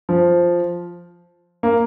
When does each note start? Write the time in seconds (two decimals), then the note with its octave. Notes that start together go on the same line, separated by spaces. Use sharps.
0.09 F3
1.63 A#3